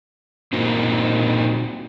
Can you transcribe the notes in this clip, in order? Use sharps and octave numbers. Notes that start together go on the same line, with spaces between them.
A#2 A#3 C4 D#4 F#4